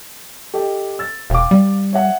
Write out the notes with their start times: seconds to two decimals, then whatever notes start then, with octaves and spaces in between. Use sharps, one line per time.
0.54 G4 A4 D#5
0.99 E6 A6
1.30 E1 F5 G5 D6
1.51 G3
1.93 C#5 E5 F#5